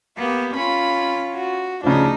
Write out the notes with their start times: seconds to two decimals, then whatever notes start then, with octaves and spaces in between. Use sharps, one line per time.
0.18 A#3 B3 G4
0.56 C#4 F4 B5
1.35 F#4
1.84 D2 C#3 F3 D4 D#4